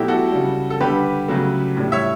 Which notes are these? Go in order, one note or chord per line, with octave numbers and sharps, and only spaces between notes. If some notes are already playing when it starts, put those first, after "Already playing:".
Already playing: B2 F#3 A3 E4 G4
F#4 A4
C#3 G3
A4
D3 G3 G4 B4
C#3 F#3 A3
A2 G3
C#5 E5